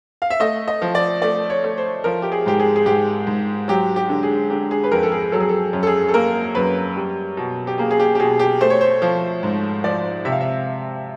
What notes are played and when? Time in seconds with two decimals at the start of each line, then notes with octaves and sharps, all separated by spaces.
0.22 F5
0.30 E5
0.40 A3 D#5
0.68 D#5
0.82 F3
0.95 D5
1.22 A3 D5
1.50 C#5
1.64 A3
1.78 C5
2.04 F3 A#4
2.22 G4
2.32 G#4
2.46 G#2 G4
2.60 G#4
2.76 G#4
2.86 G#2 G4
3.27 G#2
3.68 F#3 G4
3.96 G4
4.09 D3
4.23 G#4
4.50 D3 G4
4.71 G#4
4.84 B4
4.92 F2 A#4
5.03 A4
5.12 G#4
5.32 F#3 A4
5.40 G#4
5.49 A4
5.73 F#2
5.83 A4
5.87 G#4
6.08 A4
6.14 A#3 A#4
6.55 F#2 B4
6.96 G3
7.37 B2
7.67 G4
7.78 A#3 G#4
7.91 G#4
8.00 G4
8.15 G4
8.20 B2 G#4
8.39 G4
8.61 A3 C5
8.70 C#5
8.81 C5
9.02 F3
9.43 G#2
9.84 F3 D5
10.25 C3 E5
10.32 F5
10.41 E5